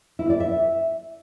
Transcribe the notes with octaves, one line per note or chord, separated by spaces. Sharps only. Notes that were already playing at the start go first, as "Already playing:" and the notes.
E4
D5
E5